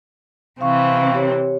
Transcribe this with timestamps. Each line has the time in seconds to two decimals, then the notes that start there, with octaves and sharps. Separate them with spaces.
0.61 C3 E3 C4 F5 C#6
1.14 G4 C#5